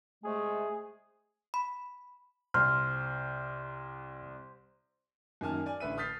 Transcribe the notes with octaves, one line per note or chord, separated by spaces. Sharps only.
C3 G#3 A3 G#4
B5
C2 C5 F6
F#2 D#3 A#3 G#5 A5 F6
D5 G#5
A1 D3 B4 E5 D#7
D#6 F6 G6 A6 B6 C7